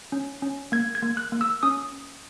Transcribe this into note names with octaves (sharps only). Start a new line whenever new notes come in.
C#4
C#4
A#3 G#6
G#6
A#3
F#6
A#3
E6
C#4 D#6